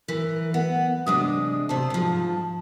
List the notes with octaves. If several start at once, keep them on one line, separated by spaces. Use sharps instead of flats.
E3 A#4
B3 F#5
C3 G#3 D4 D#6
C3 C5 A5
G#2 F3